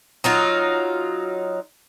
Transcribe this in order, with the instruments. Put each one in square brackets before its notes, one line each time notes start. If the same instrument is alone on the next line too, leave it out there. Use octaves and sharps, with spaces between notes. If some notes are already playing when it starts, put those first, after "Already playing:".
[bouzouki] F#3 D#4 F4